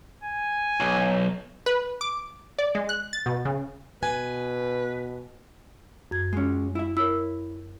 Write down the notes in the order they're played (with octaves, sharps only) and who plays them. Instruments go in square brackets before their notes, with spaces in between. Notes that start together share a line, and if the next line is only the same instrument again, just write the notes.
[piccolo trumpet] G#5
[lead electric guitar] B1
[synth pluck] B4
D6
D5
G#3
F#6
A6
B2
C#3
[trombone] B2 [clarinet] B4 [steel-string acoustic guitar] G#5
[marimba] F#2 G#6
[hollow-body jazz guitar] G#3 C#4
E4 E5
[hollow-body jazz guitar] E4 [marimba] A#4 C#5 E6